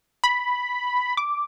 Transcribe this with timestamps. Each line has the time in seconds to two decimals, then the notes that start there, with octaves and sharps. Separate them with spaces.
0.24 B5
1.17 D6